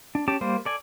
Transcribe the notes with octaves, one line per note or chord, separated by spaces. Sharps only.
D4
C#4 G4 A5 D6
G3 A#3 C5
A4 D5 G#5